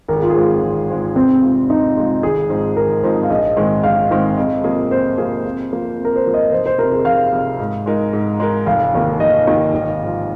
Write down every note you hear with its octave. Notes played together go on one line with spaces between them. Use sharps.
G#1 A#4
G#4
F4
G#4
G#2 G#3 C4 F4
G#1
G#2 G#3 C4 F4
F1 C4
F2 C3 G#3 F4
F1 D#4
F2 C3 G#3 F4
G#1 G#4
G#2 F3 C4 D#4
G#1 A#4
G#2 F3 C4 D#4
F5
A#1 D#5
G#2 D#3 G#3 C4
A#1 F5
G#2 D#3 G#3 C4
F2 D#5
C3 F3 A#3 G#4
F2 C5
C3 F3 A#3 G#4
F2
F3 A#3
F2
A#4
C5
F3 A#3
D#5
F1 C5
C5
F2 C3 A#4
G#4
F1 F5
F2 C3
G#2
G#3 D#4 A#4
G#2
G#3 D#4 A#4
F1 F5
D#2 D#3 A#3
F1 D#5
D#2 D#3 A#3
G#1
G#2 F3